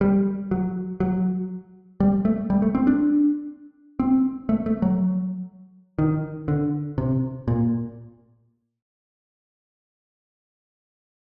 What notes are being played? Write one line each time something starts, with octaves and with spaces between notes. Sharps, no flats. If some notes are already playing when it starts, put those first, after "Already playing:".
G3
F#3
F#3
G3
A3
G3
A3
C4
D4
C4
A3
A3
F#3
D#3
D3
C3
A#2